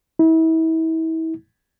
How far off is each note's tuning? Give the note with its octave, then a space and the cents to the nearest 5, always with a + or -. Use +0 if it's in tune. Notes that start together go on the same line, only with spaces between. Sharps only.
E4 -35